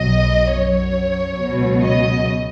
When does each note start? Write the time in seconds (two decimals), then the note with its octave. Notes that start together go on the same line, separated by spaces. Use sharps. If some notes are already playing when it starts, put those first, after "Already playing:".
Already playing: B1 B2 F#3 D#5
0.56 F#2 F#3 C#5
1.40 C#2 B2 F#3
1.82 D#5